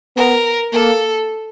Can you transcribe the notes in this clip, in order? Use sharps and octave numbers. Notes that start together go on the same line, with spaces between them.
B3 A#4
A#3 A4